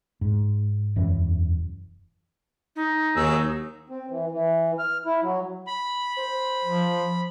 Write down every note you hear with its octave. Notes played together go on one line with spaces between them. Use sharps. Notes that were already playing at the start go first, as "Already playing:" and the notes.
G#2
E1 F#2 E3
D#4
D#2 F#3 G#4 E6
C4
E3
E3
F6
E4
F#3
B5
C5
F3